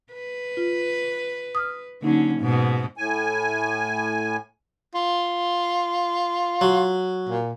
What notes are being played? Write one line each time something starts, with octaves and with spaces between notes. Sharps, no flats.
B4
F4
D#6 F6
D3 F#3 A#3 C#4 D#4
G#2 B2
A2 G#5
F4
F#3
A#2